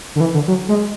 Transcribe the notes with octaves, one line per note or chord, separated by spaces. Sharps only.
D3
E3
D3
F#3
G#3